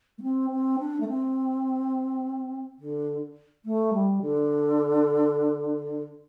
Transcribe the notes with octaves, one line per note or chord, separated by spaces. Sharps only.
A3
C4
C4
D4
A3
C4
D3
A3
G3
D3